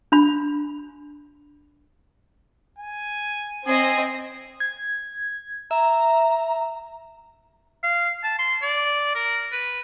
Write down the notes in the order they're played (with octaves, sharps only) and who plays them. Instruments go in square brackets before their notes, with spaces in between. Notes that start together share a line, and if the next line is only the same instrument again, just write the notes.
[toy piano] D4 B5
[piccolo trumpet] G#5
[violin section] C4 D#5 C7 [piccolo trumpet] G#5
[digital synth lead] G#6
[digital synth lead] E5 [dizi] A#5
[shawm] F5
A5
C6
D5
A#4
B4